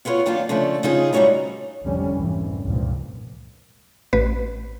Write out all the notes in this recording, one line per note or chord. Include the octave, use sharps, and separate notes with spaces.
B3 F4 F#4 B4 C#5
F#2 D#3 A#3 D4 F4
C#3 F3 A3 D4
C#3 C4 D#4 F4 G#4
G#2 G3 A3 F#4 C#5 A#5
F1 C2 D3 G3 C#4
C2 F2 G#2 E3
F1 C#2 G2 A#2 F3
A1 B4